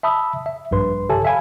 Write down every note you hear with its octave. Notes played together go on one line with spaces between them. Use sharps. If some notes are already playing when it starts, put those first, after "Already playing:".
E5 A5 B5 D#6 E6
E5
A#1 G2 B4 C6
G4 A4 C#5 E5 G#5 A5
E5 F5 G#5 A5 B5